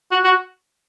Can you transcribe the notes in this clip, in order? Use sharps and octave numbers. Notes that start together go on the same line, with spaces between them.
F#4
F#4